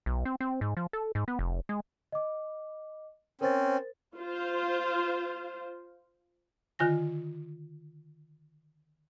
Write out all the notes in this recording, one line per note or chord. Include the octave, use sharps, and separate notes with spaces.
B1
C4
C4
G#2
F3
A4
G#2
B3
F1
G#3
D#5 D6
C4 C#4 A#4 C5 A6
F4 C5
D3 D#3 F4 G#5 A#6